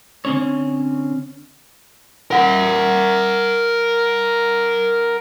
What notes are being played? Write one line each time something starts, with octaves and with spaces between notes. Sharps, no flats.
D3 C4 C#4 C#5
A#4 F#5